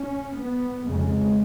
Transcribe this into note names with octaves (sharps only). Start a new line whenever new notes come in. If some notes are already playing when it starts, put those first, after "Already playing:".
Already playing: C#4
B3
F2 C#3 G#3